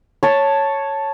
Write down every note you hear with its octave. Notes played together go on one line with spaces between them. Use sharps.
C#5 A5